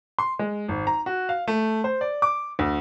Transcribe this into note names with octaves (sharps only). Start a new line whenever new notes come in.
C6
G#3
G#1
A#5
F#4
F5
A3
C5
D5
D6
D2